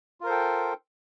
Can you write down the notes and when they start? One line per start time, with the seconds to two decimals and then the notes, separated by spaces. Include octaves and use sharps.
0.21 F4
0.23 A#4
0.26 C5
0.29 A4
0.32 G5